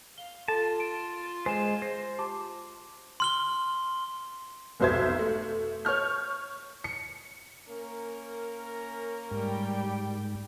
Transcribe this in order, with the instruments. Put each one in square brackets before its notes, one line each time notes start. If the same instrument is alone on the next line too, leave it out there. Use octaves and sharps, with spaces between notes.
[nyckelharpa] F5 [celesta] G7
[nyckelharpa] F4 C6 [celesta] A4 [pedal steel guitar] A5
[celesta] D7
[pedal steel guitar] G#3 C5 [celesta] G#5 E7
[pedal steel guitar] C5 [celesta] A#6
[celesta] G4 A5 D6
[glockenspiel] C6 F6 G7
[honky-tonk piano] F1 B1 B2 C5 E5 G#6
A3
C#5 C#6 F6 G6
C#7
[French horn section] A#3 C#4 A#4
[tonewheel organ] G#2 [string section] G3 G5